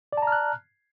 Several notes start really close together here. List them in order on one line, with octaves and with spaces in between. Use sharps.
D5 A5 A#5 F6 F#6